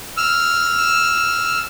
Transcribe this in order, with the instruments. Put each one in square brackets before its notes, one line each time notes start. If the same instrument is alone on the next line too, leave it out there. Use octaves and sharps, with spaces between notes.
[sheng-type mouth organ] E6 F6